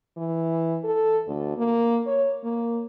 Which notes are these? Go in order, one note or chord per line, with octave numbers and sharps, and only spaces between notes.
E3
A4
D2
A#3
C#5
A#3